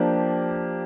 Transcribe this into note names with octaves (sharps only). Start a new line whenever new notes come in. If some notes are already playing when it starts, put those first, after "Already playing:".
Already playing: F3 A#3 D4 G4